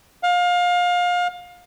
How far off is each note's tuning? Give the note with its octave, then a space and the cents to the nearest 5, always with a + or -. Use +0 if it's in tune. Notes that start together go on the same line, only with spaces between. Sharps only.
F5 +25